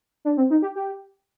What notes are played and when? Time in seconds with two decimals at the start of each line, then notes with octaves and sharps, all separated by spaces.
0.25 D4
0.37 C4
0.50 D#4
0.62 G4
0.75 G4